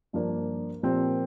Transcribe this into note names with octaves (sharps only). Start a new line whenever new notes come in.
G2 F3 A#3 D4
A#2 F3 C4 G4 A#4